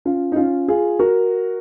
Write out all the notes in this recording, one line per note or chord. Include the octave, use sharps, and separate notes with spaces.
C#4 F4
D#4
C#4 F4
F4 G#4
F#4 A#4